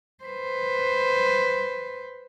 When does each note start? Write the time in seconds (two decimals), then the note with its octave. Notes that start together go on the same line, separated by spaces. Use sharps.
0.24 B4 C5